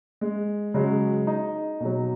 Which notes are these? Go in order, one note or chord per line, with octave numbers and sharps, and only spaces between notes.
G#3
C#3 F#3 G#3
D#4
B2 F#3